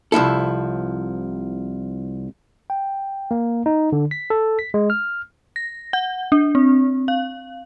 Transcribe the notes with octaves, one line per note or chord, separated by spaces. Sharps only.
C2 F3 E4 A4
G5
A#3
D#4
D3
B6
A4
B6
G#3
F6
A#6
F#5
D4
C4
F5